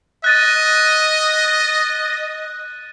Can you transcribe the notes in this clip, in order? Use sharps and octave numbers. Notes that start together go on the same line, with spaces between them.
D#5 F#6 A6 D#7